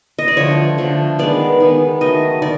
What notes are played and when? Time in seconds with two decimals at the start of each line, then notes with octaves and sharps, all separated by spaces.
0.19 D#5
0.28 D5
0.37 D3 F3 A3 C#5
0.78 D3 F3 A3
1.19 D#3 G#3 B3 D5
1.60 D#3 G#3 B3
2.01 D#3 F#3 A3 D#5
2.42 D#3 D5